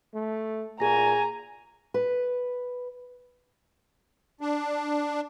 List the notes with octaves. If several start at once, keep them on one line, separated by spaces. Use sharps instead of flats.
A3
A#2 G#4 G#5 A#5 A#6
B4
D4